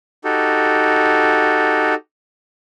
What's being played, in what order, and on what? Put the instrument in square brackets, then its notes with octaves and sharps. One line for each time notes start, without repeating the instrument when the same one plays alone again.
[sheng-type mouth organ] D#4 F#4 G4 A4